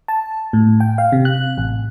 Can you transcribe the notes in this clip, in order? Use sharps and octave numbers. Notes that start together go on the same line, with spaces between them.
A5
A2
G5
F5
C3
F#6
A1